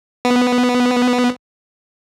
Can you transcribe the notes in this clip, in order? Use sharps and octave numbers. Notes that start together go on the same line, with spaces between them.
B3